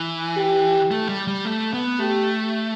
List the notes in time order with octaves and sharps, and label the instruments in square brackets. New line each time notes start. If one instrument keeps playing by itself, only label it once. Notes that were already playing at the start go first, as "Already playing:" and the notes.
Already playing: [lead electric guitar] E3
[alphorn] G4
[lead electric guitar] A3
G3
G3
A3
B3
[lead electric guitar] A3 [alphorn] G4